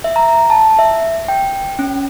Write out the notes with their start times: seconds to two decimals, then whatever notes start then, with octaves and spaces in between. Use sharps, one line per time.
0.04 E5
0.16 A#5
0.50 A5
0.79 E5
1.28 G5
1.79 C#4